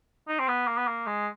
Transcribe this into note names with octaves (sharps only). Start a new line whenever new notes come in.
D#4
C4
B3
A#3
B3
A#3
G#3